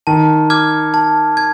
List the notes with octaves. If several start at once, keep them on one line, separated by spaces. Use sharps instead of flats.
D#3 A5
D6 F6 G#6
A5
G#6